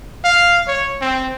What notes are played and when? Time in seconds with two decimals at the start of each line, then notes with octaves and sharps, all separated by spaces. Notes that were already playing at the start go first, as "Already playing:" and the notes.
0.24 F5
0.68 C#5
1.01 C4